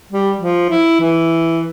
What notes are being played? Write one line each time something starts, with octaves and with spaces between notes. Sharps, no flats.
G3
F3
E4
E3